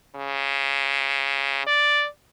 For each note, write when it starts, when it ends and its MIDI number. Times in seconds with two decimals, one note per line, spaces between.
0.15 1.62 49
1.67 2.06 74